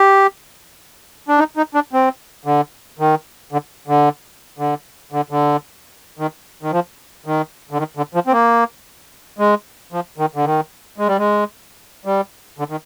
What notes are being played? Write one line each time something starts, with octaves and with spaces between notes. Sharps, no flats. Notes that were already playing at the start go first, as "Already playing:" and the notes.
Already playing: G4
D4
D#4
D#4
D4
C4
D3
D#3
D3
D3
D3
D3
D3
D#3
D#3
F3
D#3
D3
D#3
D3
F3
C4
A#3
G#3
F3
D#3
D3
D#3
G#3
G3
G#3
G3
D3
D#3